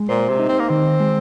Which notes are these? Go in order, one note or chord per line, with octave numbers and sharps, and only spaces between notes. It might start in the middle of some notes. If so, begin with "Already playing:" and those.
Already playing: G#3
A#2 C5
C3
D#4
C4
A#3
D#3 C4
G#3